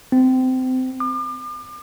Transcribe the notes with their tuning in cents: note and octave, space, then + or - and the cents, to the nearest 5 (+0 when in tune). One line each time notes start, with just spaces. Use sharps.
C4 -25
D6 +40